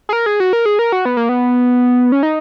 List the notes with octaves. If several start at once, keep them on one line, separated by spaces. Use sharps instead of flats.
G#4
A#4
G#4
F#4
A#4
G#4
A#4
F#4
B3
A#3
B3
C#4
D#4